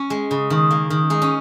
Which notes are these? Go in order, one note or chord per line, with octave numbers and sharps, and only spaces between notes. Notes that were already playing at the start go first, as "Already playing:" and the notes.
Already playing: C#4
G#3
C#3
D#3
A#3
D#3
G#3 D#4
C#4